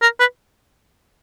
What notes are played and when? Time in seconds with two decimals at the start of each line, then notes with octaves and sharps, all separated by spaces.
0.02 A#4
0.19 B4